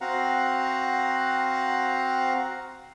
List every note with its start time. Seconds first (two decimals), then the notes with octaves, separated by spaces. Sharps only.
0.01 C4 F#4 F5 F#5 A#5